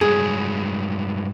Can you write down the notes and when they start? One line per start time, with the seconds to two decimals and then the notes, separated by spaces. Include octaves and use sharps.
0.01 G2 F#3 G#3 G#4